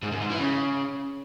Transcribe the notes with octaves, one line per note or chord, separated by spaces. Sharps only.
G#2
F#2
G#2
E3
C#3